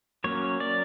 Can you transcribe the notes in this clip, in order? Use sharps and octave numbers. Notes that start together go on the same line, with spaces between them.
F#3 A#3 C#4 C#5
D5